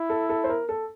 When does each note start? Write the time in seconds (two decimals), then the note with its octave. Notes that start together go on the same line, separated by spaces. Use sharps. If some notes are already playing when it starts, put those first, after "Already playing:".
Already playing: E4
0.10 A4
0.29 A4
0.44 C5
0.49 A#4
0.69 A4